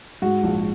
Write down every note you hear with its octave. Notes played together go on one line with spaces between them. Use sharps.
G#2 F#4
A#1